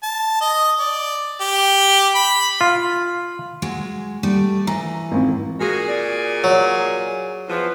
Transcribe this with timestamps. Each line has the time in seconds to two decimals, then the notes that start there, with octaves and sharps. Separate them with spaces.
0.03 A5
0.41 D#5
0.80 D5
1.41 G4
2.15 B5
2.61 F4
3.62 F#3 G#3
4.23 G3 A3 D5
4.67 E3 A#5
5.12 G#1 F2
5.60 A#2 F#4 G#4
5.88 D5
6.44 F#3
7.48 E2 F3 B4